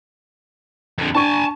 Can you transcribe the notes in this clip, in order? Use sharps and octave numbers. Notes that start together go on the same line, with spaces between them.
F2 D3
D4 G#5 A5 C#6